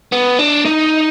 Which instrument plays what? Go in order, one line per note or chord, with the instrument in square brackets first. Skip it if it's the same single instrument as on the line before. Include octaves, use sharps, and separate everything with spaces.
[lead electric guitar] B3
D4
D#4